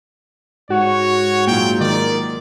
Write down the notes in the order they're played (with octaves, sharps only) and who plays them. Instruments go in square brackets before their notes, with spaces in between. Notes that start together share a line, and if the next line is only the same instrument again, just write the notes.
[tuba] G#2 [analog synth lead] F#4 [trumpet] C#5
[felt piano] A#2 F#3 F4 [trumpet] G5
[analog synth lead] D#3 [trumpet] D5